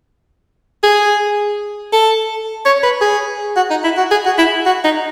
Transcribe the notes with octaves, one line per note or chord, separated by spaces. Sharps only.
G#4
A4
C#5
B4
G#4
F#4
D#4
E4
F#4
G#4
F#4
E4
F#4
D#4